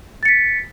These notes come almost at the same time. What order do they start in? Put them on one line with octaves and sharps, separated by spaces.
A6 C#7 B6